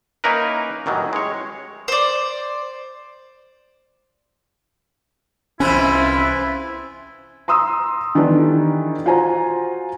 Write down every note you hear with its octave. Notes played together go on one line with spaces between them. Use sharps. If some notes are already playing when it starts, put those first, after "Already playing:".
A#3 C#4 D#4 E4 A#4 B4
A1 D#3 E3 F#3
G#3 C#5
C5 D5
C2 C3 E3 C4 C#4 E4 F4 B4
A#5 C6 D#6 E6
D#3 E3 B3 D4 G4 A4
F4 F#4 C5 G#5 A#5